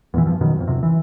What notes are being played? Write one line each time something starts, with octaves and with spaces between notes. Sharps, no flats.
E2 A#2 E3
G2 F3
F#2 B2 D#3
A1 F2
D#1 C#2 F#2 C3
E3